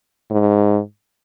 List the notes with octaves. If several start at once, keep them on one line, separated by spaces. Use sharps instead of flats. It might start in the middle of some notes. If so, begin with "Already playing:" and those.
G#2